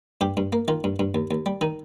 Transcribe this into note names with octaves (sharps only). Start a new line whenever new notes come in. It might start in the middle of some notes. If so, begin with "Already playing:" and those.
G2 G4
G2
A#3
D#3 F4
G2
G2
D#2
D#2
G3
D#3 D#4